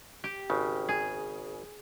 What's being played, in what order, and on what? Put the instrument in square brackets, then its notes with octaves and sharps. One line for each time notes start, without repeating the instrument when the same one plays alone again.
[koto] G4
[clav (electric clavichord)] G#1 C#3
[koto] G#4